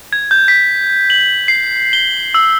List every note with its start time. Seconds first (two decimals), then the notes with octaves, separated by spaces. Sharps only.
0.13 G#6
0.31 G6
0.48 B6
1.10 F#7
1.48 C7
1.93 G7
2.34 E6